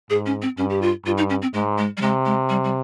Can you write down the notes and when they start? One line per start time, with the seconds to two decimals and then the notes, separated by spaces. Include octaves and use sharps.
0.10 G#2 G#4
0.26 C#4
0.42 C4
0.58 G2 C#4
0.70 G4
0.82 F4
1.06 G2 F4
1.18 D#4
1.30 C#4
1.42 C4
1.54 G#2 G#3
1.78 G#3
1.97 G3
2.01 C3 G#3
2.26 G#3
2.49 G3
2.64 G3